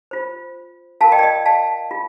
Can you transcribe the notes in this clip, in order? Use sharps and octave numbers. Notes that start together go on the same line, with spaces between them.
F4 C5
F4 A#4 F5 A5
D#5 G5
D5
D#5
F5 A5
F4